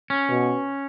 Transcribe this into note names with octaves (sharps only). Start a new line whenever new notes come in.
C#4
B2